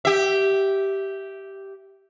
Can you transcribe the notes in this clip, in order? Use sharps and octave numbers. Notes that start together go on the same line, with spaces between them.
G4 E5